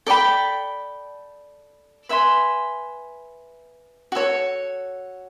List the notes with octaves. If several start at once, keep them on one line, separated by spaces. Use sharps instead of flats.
A4 D5 G5 B5
B4 E5 G#5 C6
F#4 A4 C#5